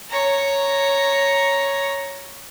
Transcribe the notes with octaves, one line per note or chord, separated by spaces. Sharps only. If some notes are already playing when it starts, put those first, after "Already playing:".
C#5 A#5